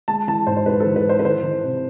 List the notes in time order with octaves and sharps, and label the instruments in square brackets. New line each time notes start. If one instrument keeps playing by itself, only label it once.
[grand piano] G#3 A5
E3 A5
G#2 C5
C5
G#2 B4
A4
E3
B4
E3 C5
B4
E3 C5
E3
C3